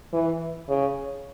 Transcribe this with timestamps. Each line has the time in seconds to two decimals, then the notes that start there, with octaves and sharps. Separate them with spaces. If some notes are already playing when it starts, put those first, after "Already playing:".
0.13 E3
0.68 C#3